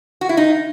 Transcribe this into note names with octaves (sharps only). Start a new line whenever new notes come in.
F#4
E4
D#4